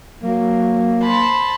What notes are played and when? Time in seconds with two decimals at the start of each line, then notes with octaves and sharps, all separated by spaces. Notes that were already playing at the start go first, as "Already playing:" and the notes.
0.23 F#3 A#3
1.01 C5 A5 B5